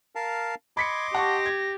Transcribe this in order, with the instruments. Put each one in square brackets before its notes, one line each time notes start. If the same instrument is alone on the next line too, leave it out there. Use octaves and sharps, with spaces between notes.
[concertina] A#4 F5 A5
[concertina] D#5 C6 D6 [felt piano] B5 B6 C#7 [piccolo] G#6
[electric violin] G4 [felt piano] F#5 A5 C#6 [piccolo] A#6
[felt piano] G#6